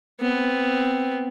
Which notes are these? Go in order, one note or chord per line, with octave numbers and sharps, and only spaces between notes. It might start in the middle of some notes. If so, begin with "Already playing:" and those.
B3 C4